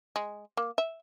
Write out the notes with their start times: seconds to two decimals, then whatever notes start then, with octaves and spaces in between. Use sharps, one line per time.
0.16 G#3
0.57 A#3
0.78 E5